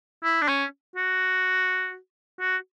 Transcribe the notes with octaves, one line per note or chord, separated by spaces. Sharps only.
E4
D4
C#4
F#4
F#4